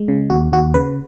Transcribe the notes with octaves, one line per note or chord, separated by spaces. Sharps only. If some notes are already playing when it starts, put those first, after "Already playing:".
Already playing: G#3
C#3
D#2 F#4
D#2 F#4
C#3 B4